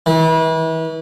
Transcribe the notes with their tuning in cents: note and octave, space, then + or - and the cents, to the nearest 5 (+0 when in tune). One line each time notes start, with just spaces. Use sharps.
E3 -35